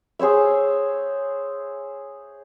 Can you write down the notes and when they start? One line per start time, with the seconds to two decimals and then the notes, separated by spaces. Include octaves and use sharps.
0.19 G#4 C5 C#5 E5